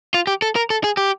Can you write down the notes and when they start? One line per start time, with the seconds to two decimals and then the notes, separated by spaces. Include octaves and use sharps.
0.14 F4
0.27 G4
0.42 A4
0.56 A#4
0.70 A4
0.84 G#4
0.97 G4